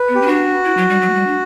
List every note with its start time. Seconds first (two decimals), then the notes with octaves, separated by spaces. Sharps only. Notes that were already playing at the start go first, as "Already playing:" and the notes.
Already playing: B4
0.08 B3
0.15 G4
0.22 C#4
0.27 D4 F#4
0.65 E4
0.77 F#3
0.89 G3
1.01 F#3
1.09 A3
1.14 G3
1.27 D4